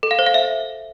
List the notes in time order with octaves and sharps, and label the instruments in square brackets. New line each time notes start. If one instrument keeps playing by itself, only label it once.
[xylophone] A4
F5
C5
F5
E5